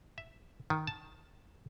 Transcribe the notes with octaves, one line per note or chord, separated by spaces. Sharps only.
E5
D#3
A5